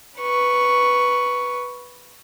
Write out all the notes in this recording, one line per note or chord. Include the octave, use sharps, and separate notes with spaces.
B4 C#6